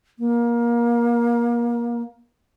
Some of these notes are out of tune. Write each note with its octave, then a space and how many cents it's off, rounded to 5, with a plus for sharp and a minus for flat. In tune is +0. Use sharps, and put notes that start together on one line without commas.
A#3 +25